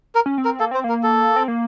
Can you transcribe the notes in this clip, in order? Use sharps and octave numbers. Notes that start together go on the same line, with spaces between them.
A#4
C#4
C4
A#4
A#3 A4
C4 C5
A#3 A#4
A4
C4
A#3